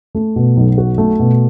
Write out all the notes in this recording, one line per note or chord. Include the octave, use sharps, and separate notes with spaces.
A3
B2
B1
F#4
A3
B2